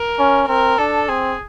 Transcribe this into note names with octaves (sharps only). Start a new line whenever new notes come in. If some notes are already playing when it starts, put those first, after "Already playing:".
Already playing: A#4
C#4
C4 A#4
D4 A4
C4 G#4